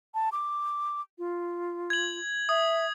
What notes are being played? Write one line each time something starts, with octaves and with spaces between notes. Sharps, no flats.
A5
D6
F4
G#6 F#7
E5 D#6